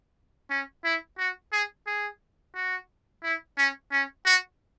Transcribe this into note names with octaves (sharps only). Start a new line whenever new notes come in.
C#4
E4
F#4
G#4
G#4
F#4
E4
C#4
C#4
F#4